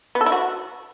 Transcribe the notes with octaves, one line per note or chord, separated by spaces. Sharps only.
B3
A4
E4
F#4